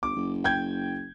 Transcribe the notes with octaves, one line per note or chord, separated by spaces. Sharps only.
G1 D6
F#1
G5 G6 G#6